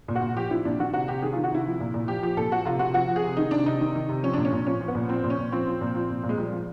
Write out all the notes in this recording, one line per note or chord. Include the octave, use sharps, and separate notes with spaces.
A#2
F#4
A#2
F3 G4
F3 E4
A#2 D4
D#3 F#4
C3 F#4
C3 G4
D#3 G#4
D#3 F4
F#4
C3 E4
F3
A#2
A#2
F3 G4
F3 G4
A#2 A4
F3 F#4
C3 F4
C3 F#4
F3 F#4
F3
G#4
C3
D#3 D#4
C3 D4
C3 D#4
D#3
D#3
C3
F3 C#4
A#2 D4
C#4
A#2
F3 C#4
F3
B3
A#2
F3 C4
A#2
C#4
A#2
F3 C4
F3
A#2
F3
A#2
A#2
G#3
F3 G3
F3